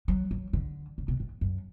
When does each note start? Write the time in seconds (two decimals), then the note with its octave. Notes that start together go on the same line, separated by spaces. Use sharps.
0.08 F#3
0.31 F#3
0.53 D3
0.98 C#3
1.08 B2
1.20 A2
1.41 F#2